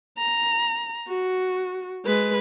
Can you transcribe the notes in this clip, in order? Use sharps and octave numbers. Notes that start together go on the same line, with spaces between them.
A#5
F#4
G#3 B4